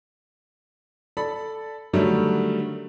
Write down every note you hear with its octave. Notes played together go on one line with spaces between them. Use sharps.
A4 D5 B5
D3 D#3 F#3 G3 A3